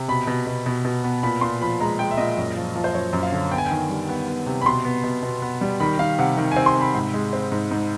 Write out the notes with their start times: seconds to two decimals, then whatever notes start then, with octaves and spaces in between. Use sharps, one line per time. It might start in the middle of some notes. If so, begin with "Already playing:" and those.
Already playing: C3
0.08 B2 B5
0.27 B2
0.46 B2
0.66 B2
0.85 B2
1.04 B3
1.23 A#2 B5
1.41 A#2 C6
1.61 F3 B5
1.80 G#3 A#5
1.99 G#3 G5
2.11 E5
2.18 A#2 D#5
2.37 F#2
2.57 F3
2.76 F3
2.84 C5
2.95 F#2 C#5
3.13 F#2
3.23 F5
3.32 D3
3.51 B3 G5
3.58 G#5
3.66 D#3 G5
3.89 G3
4.09 B3
4.28 B3
4.46 C3
4.61 B5
4.66 B2 C6
4.85 B3
5.03 B2
5.23 B2
5.42 B3
5.61 G3
5.80 D#3 B5
5.99 D#3 F5
6.19 C3 F#5
6.37 D#3
6.52 C4 G#5
6.66 C6
6.75 C3
6.81 B5
6.95 G#2
7.14 G#3
7.33 C4
7.52 G#2
7.71 G#2